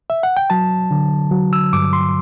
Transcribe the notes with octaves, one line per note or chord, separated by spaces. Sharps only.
E5
F#5
G5
F#3 A5
D3
F#3
E6
G2 D6
C6